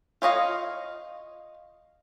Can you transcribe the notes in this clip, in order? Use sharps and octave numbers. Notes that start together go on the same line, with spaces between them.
F4 C#5 D#5 F5